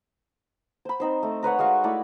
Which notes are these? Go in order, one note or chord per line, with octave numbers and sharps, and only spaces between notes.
C5 B5
C4 D#4 C5
A3
A#4 B4 C#5 F#5
G#3 F#4 F5 C#6
A3 E4 D5 B5